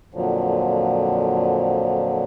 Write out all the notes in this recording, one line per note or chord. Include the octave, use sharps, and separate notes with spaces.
F2 A#2 D3 F3 F#3